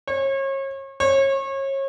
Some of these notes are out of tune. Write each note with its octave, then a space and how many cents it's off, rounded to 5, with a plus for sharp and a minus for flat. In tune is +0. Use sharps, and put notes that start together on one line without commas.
C#5 -35
C#5 -30